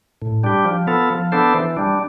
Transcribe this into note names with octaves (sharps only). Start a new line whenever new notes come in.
A2
G3 D4 G4
F3
B3 F4 A4
F3
B3 D4 A4 C5
E3
G3 D4